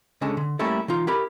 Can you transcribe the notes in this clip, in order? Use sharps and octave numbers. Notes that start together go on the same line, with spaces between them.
C#2 D3 G#3 C#4 A5
D3
G3 A3 A#3 C#4 E4 A4
E3 D#4 F4
E4 G4 A#4 B5